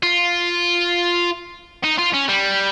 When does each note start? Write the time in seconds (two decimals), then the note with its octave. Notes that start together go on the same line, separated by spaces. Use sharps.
0.03 F4
1.84 D#4
1.99 F4
2.14 C#4
2.29 G3